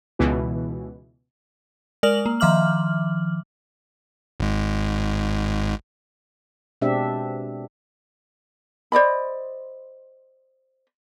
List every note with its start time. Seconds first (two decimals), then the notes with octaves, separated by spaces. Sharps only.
0.19 C#2 B2 E3
2.03 G#3 A#4 D5 F6 F#7
2.26 A#3
2.40 D#3 F3 E5 D6 F6 F#7
4.40 G#1 G#2
6.82 B2 G#3 C4 D4 G4 E5
8.92 C5 D5 D#5 B5